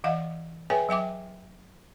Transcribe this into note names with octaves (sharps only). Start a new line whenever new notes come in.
E3 D#5 F5 F#5
G#4 B4 C#5 E5 G5 G#5
F#3 E5 G5 D6